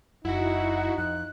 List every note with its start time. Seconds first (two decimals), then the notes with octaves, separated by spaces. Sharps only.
0.25 F#1 F#2 D#4 E4 F#4 F#5
0.98 F2 F#6